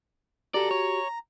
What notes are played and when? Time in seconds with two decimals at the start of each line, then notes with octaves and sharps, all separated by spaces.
0.54 F#4 G4 A4 D5 A#5
0.71 C#5